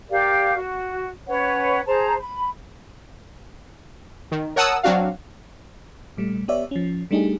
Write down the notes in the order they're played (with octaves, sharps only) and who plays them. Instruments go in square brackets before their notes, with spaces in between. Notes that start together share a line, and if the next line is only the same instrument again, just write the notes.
[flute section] G4 A#4 D5 F5
F#4
C#4 B4 C#5 F#5
G#4 C5 A5 A#5
B5
[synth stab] D#3
A#4 C#5 F#5 A5 D#6 E6
F#3 C4 D4 F#4 F5
[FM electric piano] A#2 G3 A3
B3 G4 C#5 D5 E5
F3 C#4
G3 A3 D4 D#4 G4 G#4